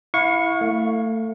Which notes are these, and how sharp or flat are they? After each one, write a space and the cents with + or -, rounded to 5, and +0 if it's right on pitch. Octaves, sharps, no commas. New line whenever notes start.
E4 +0 F5 +40 C#6 +0
A3 +25 F5 +0